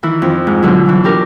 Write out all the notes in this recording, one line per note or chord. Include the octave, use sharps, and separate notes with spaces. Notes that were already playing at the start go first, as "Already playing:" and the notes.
D#3 E3 E4
F2
G#2
B2 D3 F#3
E3 F#3
D4 G4 A#4